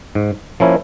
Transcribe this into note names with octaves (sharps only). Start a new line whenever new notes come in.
G#2
F3 A#3 C#4 E4